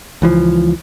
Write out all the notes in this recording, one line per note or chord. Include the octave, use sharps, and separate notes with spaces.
C#2 E3 F3